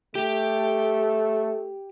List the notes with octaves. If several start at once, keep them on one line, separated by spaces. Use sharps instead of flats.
A3 G4